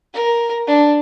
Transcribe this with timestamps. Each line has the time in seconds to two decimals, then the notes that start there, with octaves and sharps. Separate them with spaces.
0.14 A#4
0.67 D4